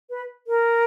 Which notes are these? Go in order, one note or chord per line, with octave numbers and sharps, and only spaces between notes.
B4
A#4